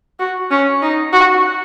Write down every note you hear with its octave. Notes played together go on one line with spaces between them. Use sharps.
F#4
C#4
D#4
F#4